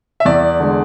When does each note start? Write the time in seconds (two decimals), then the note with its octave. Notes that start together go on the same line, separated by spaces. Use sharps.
0.20 E5
0.25 E2 D5
0.60 D3 G#3